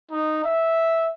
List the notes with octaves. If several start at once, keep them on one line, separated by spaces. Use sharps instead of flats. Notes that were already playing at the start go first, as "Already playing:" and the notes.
D#4
E5